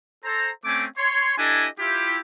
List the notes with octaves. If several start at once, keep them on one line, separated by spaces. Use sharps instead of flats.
A4 C5 A#5
A3 C4 C#4 G#5 D6
C#5 C6
D4 E4 G4 A4 D#5 G#5
E4 F4 G4